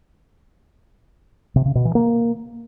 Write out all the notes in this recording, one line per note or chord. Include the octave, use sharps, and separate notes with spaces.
C3
C#3
B2
E3
A#3